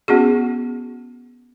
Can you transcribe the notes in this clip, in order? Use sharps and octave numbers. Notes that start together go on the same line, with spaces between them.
B3 C#4 F#4 G#4